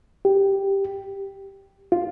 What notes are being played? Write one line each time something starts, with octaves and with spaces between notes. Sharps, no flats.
G4
F4